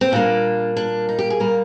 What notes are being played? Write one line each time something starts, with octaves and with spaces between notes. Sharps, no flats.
C4
A#2 G3 A#3 D4
D4
D#4
G4
G#4
A#2 G3 A#3 A#4